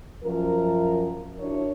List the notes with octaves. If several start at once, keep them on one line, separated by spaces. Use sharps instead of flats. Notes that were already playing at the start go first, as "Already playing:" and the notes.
F#2 F3 A#4
D4 E4 F#4 A#4 C#5